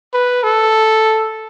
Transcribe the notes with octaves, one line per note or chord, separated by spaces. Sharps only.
B4
A4